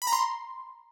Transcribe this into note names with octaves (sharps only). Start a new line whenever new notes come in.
B5
A#5
C6